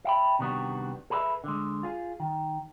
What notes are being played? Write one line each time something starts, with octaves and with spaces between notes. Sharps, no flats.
E5 G5 B5
C3 D#3 G3 B3 D4 F#4
G#4 A4 B4 D5 E5
D3 G#3
F4 G#4
D#3